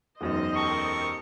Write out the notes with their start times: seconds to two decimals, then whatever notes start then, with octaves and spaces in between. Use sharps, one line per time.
0.21 E1 F#2 D#4 C5 D#5
0.55 G4 A4 A#4 C#6